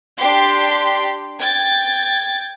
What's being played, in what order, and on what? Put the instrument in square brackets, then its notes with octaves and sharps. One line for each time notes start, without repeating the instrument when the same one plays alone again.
[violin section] D4 G4 C6
G5 G#6 A6